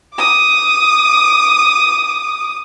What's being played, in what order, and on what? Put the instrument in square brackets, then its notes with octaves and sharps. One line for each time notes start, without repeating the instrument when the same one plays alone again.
[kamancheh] D6 D#6